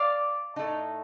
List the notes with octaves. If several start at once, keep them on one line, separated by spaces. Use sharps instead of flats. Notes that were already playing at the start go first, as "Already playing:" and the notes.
Already playing: D5 F5
A2 A3 D#4